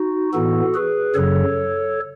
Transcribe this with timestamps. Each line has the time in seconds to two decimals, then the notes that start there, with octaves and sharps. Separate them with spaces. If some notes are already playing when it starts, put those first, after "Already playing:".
Already playing: D#4 F#4
0.33 A2 E3 B3 F#4 A4
0.74 G#4 B4
1.14 F#2 C#3 F#3 A4 C#5